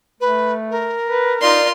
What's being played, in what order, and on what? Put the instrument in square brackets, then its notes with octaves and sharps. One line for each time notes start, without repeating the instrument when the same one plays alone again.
[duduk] A3 [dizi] B4
[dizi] A#4
[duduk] B4
[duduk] D#4 [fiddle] F4 C6 [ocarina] D5